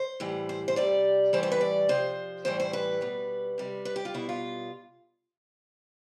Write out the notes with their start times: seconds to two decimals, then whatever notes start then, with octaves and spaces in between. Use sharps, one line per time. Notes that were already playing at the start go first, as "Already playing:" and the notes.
Already playing: C5
0.20 A2 E3 G3
0.49 C5
0.68 C5
0.76 C3 G3 D5
1.33 A2 E3 G3 C5
1.43 C5
1.52 B4
1.61 D5
1.89 C3 F3 C5
2.45 A2 E3 G3 C5
2.60 C5
2.73 B4
3.01 B2 G3
3.58 C3 G3
3.85 B4
3.96 G4
4.05 F4
4.14 B2 G3 E4
4.29 F4